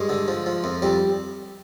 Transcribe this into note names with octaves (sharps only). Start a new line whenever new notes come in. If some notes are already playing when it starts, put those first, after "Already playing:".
Already playing: G2 G#3
D3
F3
F3
F2
F2 G3